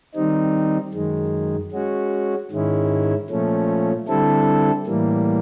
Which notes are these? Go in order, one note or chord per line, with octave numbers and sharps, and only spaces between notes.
D#3 G3 C4 D#4
F#2 D#3 G#3
G#3 C#4 F#4
G#2 D#3 G#3 C#4 E4
A#2 F3 A3 C#4
D3 G3 C4 E4 A4
A2 E3 G3 A#3